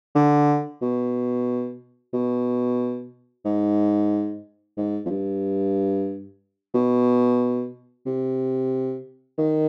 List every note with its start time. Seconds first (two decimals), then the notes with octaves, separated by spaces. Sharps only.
0.15 D3
0.82 B2
2.13 B2
3.45 G#2
4.77 G#2
5.06 F2
5.10 G2
6.74 B2
8.06 C3
9.38 D#3